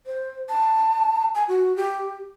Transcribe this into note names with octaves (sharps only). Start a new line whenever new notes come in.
C5
A5
G#5
F#4
G4